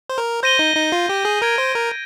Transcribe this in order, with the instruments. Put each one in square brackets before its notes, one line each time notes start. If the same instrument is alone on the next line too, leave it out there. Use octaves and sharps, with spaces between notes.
[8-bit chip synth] C5
A#4
[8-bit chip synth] C5 [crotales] G6 A#6 D#7 G7
[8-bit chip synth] D#4
D#4
F4
G4
G#4
[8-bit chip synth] A#4 [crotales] G#6 D7 G7
[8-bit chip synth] C5
A#4